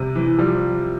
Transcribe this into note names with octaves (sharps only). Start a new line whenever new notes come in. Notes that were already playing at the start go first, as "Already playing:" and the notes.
Already playing: C3 G3
E3
E3
F3 G3